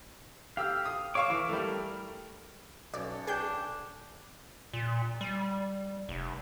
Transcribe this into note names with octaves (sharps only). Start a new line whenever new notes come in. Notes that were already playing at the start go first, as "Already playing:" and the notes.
G4 F5 E6 F6
D#6
C#5 F5 C#6 D6 E6
E3
G3 A3 A#4
B1 C#4 A4 D5
D4 G#4 G5 G6
A#2
G3
F1